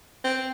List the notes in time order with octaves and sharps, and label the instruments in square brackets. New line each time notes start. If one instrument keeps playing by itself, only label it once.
[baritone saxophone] C4